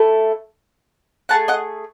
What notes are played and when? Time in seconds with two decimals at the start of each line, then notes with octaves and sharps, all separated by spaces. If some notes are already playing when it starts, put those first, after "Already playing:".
Already playing: A3 E4 A4
1.29 A3 D#4 G#4 F#5 A5
1.48 D#5 F#5